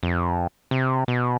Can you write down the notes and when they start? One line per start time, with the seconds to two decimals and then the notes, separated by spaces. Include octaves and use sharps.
0.03 F2
0.71 C3
1.08 B2